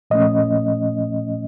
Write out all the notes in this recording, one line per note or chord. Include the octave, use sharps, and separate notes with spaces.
A#2 F3 A3 C#4 D#5